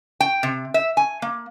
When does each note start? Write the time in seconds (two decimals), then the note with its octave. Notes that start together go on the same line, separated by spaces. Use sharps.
0.20 G5
0.43 C3
0.74 E5
0.97 G#5
1.22 A#3